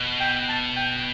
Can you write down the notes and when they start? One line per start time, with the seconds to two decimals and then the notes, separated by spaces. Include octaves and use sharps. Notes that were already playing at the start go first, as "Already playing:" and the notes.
Already playing: B2
0.20 G5
0.49 A5
0.76 G5